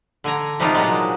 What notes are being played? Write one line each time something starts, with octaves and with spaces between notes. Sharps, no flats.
D3 G#5 A#5
C3 G3 G#3 D4 D#4 F4
A#2 F#3 G#3